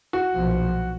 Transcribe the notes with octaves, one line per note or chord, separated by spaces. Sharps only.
F#4
B1 A#2 F3